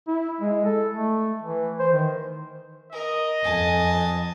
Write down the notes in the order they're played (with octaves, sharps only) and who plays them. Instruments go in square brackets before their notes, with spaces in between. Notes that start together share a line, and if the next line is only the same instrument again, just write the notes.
[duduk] E4
G#3
A4
A3
E3
C5
D#3
[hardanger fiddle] A#4 [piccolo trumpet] D#5
[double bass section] F2 [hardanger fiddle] G#5 A5